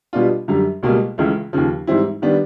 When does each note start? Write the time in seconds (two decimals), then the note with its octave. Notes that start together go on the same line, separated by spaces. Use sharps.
0.13 B2 G3 B3 D4 F4
0.48 F#2 D3 G3
0.83 C#2 B2 G3 A#3
1.18 C#2 C#3 E3 A3
1.53 D#2 C#3 F3
1.87 G#2 E3 G3 C4 E4
2.22 D#3 G3 B3 D4